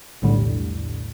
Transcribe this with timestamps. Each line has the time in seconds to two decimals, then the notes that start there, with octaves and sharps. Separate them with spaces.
0.22 B1 E2 A2 D3 G3